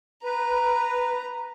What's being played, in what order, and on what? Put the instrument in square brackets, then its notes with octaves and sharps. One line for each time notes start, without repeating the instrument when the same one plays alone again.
[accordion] B4 [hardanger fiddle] A#5